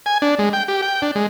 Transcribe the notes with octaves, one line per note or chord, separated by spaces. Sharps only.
G#5
D4
G#3
G5
G4
G5
D4
G#3